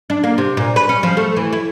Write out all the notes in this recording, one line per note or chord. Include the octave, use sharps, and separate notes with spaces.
D4
A#3
C3
A#2
B4
C#4
F3
A3
E3
E4